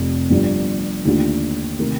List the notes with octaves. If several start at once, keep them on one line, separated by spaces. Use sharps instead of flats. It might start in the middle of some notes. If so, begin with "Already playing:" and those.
Already playing: F1 F2 C3
G1 G2 F3
D#2 D3 A3 D4 F4
C3 D#3 A3 D#4 A#4